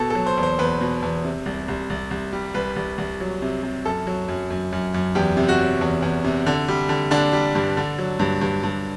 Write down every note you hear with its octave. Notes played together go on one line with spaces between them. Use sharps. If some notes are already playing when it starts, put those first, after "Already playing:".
Already playing: B2 A4
F#3 A4
C5
E2
C5
E2 B4
B2
E2
C3
C2
C2
C2
C2
G3
C2 B4
C2
C2
F#3
C3
C3
F#2 A4
F#3
F#2
F#2
F#2
F#2
E2 G4
C3
F#4
F#3
E2
E2
C3
D3
G3
D3
D3 D4
G3
G2
D3
F#3
G2
G2
G2